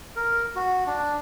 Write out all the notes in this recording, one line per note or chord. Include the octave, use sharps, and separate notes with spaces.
A#4
F#4
D4